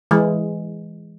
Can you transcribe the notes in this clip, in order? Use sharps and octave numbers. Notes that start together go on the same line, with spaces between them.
E3 G#3